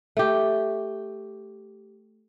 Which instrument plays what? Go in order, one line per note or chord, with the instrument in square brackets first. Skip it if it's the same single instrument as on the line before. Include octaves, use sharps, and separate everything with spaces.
[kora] A3 G4